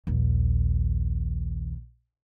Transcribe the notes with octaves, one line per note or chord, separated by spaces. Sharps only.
A#1 D#2